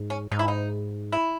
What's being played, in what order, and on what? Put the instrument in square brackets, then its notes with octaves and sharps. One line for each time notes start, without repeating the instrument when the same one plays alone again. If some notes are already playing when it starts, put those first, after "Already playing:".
Already playing: [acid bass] G#2
[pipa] C#4
[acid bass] G#2 [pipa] D#4
[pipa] E4
D#4
E4